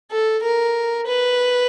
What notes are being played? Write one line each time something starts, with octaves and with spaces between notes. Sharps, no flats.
A4
A#4
B4